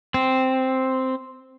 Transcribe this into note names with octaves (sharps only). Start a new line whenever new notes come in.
C4